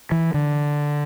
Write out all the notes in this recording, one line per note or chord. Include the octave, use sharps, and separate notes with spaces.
E3
D3